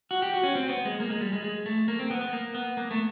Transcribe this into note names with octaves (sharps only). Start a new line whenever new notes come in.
F#4
G4
F#4
C#4
C4
B3
G#3
A#3
G#3
G3
G#3
G#3
A3
A#3
C4
B3
B3
A#3
B3
A#3
A3